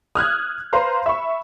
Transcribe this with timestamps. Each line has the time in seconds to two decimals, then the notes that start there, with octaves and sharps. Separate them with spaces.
0.15 D#6 F6 F#6 G#6
0.73 B4 C5 F5 A#5 C6
1.06 E5 B5 C#6